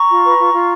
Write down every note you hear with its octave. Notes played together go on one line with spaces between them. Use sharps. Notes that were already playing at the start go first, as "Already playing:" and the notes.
Already playing: A#5 C#6
F4
B4
F4
F4